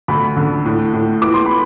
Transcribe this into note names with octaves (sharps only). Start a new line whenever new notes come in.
D2 B5
D3
A2
A2
E3 D6
C6
B5